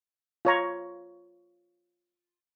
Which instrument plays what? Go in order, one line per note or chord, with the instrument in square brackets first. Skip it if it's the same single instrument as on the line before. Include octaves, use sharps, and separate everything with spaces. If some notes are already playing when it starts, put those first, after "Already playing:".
[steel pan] F4 C#5 A#5